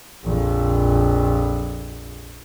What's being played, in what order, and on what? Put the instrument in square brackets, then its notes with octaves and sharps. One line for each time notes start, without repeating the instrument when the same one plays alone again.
[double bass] A#1 F2